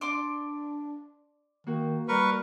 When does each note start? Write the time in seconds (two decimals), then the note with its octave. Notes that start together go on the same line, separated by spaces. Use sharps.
0.01 D4 D5 C6 D6
1.67 D#3 A#3 F#4
2.08 G3 A#4 B4 C#6